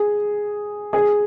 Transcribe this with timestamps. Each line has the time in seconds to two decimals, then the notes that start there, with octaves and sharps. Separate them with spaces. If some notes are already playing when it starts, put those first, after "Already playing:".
Already playing: G#4
0.93 G#4